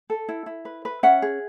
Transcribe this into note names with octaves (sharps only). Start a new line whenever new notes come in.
A4
E4
E4
B4
B4
C#4 E5 F#5
G#4